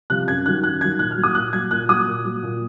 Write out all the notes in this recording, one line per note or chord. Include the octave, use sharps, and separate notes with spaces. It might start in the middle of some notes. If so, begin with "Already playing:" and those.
C3 F3 F#6
F#2 G#6
D#3 F#3 F#6
F#2 F#6
D#3 F#3 G#6
A#2 F#6
F6
F#3
D#6
A#2 F#6
F#3 G#6
A#2 F#6
F#3 D#6
A#2
F#3
A#2